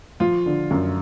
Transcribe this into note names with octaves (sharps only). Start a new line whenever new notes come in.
F3 F4
D3
F#2